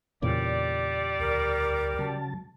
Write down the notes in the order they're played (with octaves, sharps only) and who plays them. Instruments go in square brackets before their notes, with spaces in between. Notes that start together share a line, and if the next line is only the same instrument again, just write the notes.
[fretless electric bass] E2 A#2 C#3 [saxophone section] G3 D5
[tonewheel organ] D2 [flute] A#4
[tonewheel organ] C#3 F#3 A5